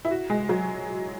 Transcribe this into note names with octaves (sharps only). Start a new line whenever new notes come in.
E4
F#4
G#3
F#3